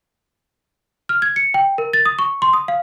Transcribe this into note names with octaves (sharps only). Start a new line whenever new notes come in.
F6
G#6
C#7
G5
A#4
A6
D#6
C#6
C6
D#6
F5